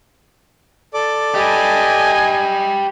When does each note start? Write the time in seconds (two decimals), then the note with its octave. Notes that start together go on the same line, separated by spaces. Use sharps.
0.94 A4 D5 D6
1.35 G4 B4 D#5 G#5